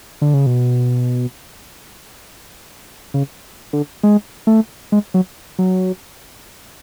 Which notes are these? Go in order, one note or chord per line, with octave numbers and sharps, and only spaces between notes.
D3
C#3
B2
C#3
D3
G#3
A3
G#3
F#3
F#3